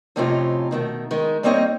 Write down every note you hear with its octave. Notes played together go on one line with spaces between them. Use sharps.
F2 A2 C3 C#4 D#4 F4
B2 D#3 A3
D#3 G#3
G3 A#3 C4 D#4 C#5 D#5